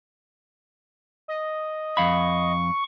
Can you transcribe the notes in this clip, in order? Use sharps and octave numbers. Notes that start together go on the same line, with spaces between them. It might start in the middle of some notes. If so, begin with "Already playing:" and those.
D#5
F2 F5 B5 C#6